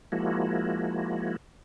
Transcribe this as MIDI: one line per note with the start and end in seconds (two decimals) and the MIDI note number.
0.12 1.36 53
0.12 1.36 56
0.12 1.36 58
0.12 1.36 64
0.12 1.36 66